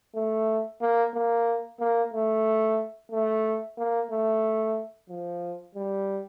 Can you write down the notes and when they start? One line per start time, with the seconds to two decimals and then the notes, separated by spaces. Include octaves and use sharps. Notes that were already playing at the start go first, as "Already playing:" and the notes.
0.15 A3
0.81 A#3
1.14 A#3
1.80 A#3
2.14 A3
3.11 A3
3.78 A#3
4.11 A3
5.10 F3
5.75 G3